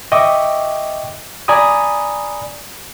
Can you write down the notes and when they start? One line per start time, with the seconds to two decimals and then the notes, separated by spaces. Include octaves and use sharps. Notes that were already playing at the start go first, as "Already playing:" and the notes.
0.12 D#5 E5 G5 C#6 D6
1.48 D5 G#5 A#5 B5 D#6